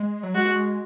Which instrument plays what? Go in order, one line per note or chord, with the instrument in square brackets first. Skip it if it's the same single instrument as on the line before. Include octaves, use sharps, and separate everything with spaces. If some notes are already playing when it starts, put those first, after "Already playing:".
Already playing: [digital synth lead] G#3
F#3
[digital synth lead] G#3 [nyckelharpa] F#4
[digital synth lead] G#3